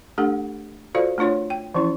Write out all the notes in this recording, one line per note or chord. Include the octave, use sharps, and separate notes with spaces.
A3 D4 G4 A4 F#5
F4 F#4 A4 C5 D5 F5
A3 D4 F4 C#5 C6
G5
E3 F3 C#4 E4